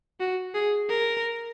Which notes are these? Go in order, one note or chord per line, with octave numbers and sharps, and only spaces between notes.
F#4
G#4
A#4